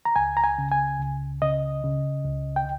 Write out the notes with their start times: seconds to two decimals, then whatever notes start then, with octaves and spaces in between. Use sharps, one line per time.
0.05 A#5
0.16 C#2 G#5
0.37 A#5
0.44 G#5
0.58 C#3
0.71 G#5
1.00 C#2
1.42 C#3 D#5
1.84 C#3
2.26 C#2
2.56 G5